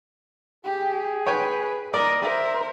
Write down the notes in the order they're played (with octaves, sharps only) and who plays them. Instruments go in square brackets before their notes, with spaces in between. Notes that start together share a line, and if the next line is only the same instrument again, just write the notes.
[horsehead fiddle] G4 [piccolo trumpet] G#4
[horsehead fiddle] B4 [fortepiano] C#5 G5 G#5
[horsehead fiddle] A#4 [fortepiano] D5 [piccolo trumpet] D#5
[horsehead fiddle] A#4 C5 [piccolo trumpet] E5